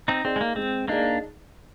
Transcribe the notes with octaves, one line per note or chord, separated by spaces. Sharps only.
C4 D#4
C4 D#4 G#4 D5
G#3
A#3
G#3 C4
A#3 D4 D#4 G#4 D5